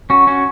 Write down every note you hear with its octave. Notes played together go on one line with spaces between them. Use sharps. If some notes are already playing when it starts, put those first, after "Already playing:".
C#4 F#4
C#4 F#4